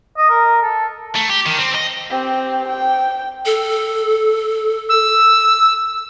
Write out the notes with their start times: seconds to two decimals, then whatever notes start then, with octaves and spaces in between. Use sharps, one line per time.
0.17 D#5
0.30 A#4
0.62 A4
1.16 A3
1.30 G4
1.46 D#3
1.59 C4
1.75 D#5
2.10 C4 G4
2.68 G5
3.46 A4
4.89 E6